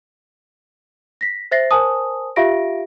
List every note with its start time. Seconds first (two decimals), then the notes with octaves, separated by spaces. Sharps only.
1.21 A#6 B6
1.51 C5 E5 A6 A#6 C7
1.71 A#4 C5 G#5 A5 D#6
2.36 F4 G4 E5 F5 A#6 D7